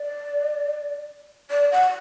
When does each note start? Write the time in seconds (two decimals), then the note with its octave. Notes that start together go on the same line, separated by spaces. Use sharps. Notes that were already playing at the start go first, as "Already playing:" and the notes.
Already playing: D5
1.51 D5
1.72 F#5